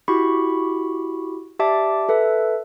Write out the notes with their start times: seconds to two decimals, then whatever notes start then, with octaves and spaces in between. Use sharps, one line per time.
0.08 E4 F#4 G4 B5 C#6
1.59 G4 D5 E5 A5 D6
2.09 A4 B4 E5